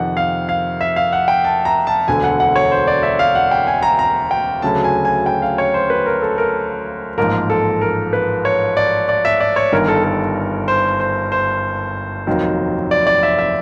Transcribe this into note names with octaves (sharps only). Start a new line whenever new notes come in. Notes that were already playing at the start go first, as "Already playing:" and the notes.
Already playing: F2 C3 D#3 F#5
F5
F5
E5
F5
F#5
G5
A5
A#5
A5
E1 D2 D3 G#5
F#5
F#5
C#5
C5
D5
E5
F5
F#5
G5
G#5
A#5
A#5
G5
D2 C#3 F#3 A3 A5
G#5
G#5
G5
F5
C#5
C5
B4
A#4
A4
A#4
A1 G#2 F3 A#3 A#4
A4
A#4
B4
C#5
D5
D5
E5
D5
C#5
G1 G2 D#3 A#4
A4
A4
C5
C5
C5
F1 D#2 D#3 F#3
D5
D5
E5
E5